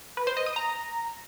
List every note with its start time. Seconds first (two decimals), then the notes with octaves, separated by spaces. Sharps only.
0.17 B4
0.27 C5
0.37 D#5
0.46 D#6
0.56 A#5